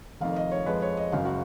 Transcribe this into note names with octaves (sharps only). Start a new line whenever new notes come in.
F1 F2 D#3 F5
D#5
C#5
F2 F3 G#3 B4
C#5
D#5
F#1 F#2 C#3 G#3 F5
F#4